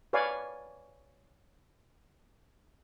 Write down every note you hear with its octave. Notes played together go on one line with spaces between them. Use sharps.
B4 C#5 D5 F5 G#5